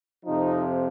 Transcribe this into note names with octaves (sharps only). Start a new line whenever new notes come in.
F2 C3 F3 D#4